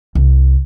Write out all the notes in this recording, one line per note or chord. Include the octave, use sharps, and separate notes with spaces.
C2